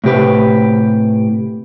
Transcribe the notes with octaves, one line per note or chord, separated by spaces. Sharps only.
A2 C3 G4 B4